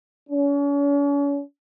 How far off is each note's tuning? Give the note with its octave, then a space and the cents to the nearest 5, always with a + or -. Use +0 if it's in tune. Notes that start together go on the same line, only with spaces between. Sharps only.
C#4 +40